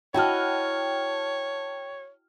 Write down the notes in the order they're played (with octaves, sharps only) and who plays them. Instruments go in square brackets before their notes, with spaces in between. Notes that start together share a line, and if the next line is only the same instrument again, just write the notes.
[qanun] E4 F#4 D#5 [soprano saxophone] C#5 [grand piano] G5 A5 F6